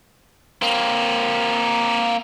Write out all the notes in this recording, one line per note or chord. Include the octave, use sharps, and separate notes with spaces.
A#3 C4